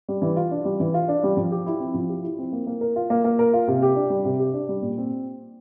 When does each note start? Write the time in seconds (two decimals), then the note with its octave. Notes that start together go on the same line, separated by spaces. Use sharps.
0.09 G3
0.22 E3
0.36 F4
0.51 D4
0.65 G3
0.80 E3
0.94 F4
1.08 D4
1.24 G3
1.37 F3
1.52 G4
1.66 E4
1.80 C4
1.94 F3
2.09 G4
2.23 E4
2.39 C4
2.53 A#3
2.67 A#3
2.81 A#4
2.96 F4
3.10 A#3
3.24 A#3
3.39 A#4
3.53 F4
3.68 C3
3.82 G4
3.96 D4
4.10 G3
4.25 C3
4.40 G4
4.53 D4
4.69 G3
4.82 A#2
4.98 C4